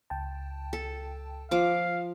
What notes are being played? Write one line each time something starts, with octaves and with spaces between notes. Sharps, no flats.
C#2 G5 A5
A4
F3 F5 D6